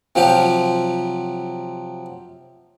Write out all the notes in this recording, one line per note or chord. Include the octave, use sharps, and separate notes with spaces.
C3 F3 F#3 G4